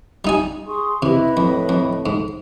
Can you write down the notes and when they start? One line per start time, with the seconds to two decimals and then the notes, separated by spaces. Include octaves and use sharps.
0.25 G3 D#4 G#5
0.67 G#4 C6 C#6 D#6
1.02 C3 E4 B4 D#5 B5
1.37 F2 A2
1.69 F2
2.06 G#2